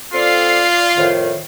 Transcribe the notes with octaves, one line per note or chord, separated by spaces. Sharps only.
C4 F4 A4 D5 C7
F2 A2 D#3